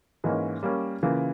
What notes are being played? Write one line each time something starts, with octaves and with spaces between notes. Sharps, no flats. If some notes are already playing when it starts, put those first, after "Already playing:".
G#2 E3 A#3 C#4
G3 A#3 C#4
C#3 E3 A#3 F4